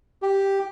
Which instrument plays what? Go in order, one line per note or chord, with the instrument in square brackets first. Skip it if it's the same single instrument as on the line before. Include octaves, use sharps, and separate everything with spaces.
[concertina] G4